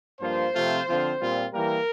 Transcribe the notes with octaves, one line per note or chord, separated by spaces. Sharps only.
G2 F3 A#3 F4 C5
C3 F3 A3 C4 F4
D3 F3 C4 F4
A#2 G3 C4 F4
E3 G3 A#3 A#4